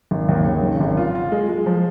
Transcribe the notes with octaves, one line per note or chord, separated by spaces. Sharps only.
G#1
D#2
C#3
G#1
G#1
F4
F4
G#3
G#3
F3